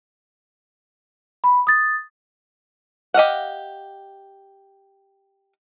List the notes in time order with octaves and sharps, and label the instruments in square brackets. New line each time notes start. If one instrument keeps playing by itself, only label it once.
[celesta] B5
D#6 A6
[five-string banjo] G4 D#5 F5 F#5